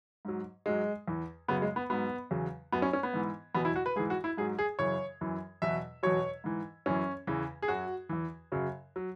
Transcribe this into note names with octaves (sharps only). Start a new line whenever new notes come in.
G#2 F#3
G#2 F#3 G#3
E2 E3
F#2 C#3 F#3 B3
G#3
B3
G#2 F#3 B3
E2 C#3 F#3
F#2 F#3 B3
C#4
C#4
B3
G#2 E3
E2 B2 F#3 B3
E4
F#4
B4
G#2 E3 G#4
F#4
E4
G#2 F#3 G#4
G#4
F#2 C#3 E3 C#5
F#2 E3
E2 B2 F#3 E5
E2 B2 F#3 C#5
G#2 E3
F#2 E3 C#4
E2 C#3 E3
G#4
F#2 F#3 F#4
E2 E3
F#2 C#3 F#3
F#3